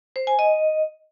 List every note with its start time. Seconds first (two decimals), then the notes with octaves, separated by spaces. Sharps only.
0.16 C5
0.27 G#5
0.39 D#5